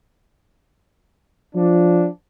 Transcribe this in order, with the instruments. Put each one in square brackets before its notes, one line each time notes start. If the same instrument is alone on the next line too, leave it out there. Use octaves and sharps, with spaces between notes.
[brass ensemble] F3 D4